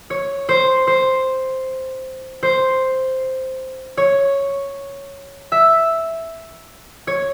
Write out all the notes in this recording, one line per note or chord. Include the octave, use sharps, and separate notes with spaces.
C#5
C5
C5
C5
C#5
E5
C#5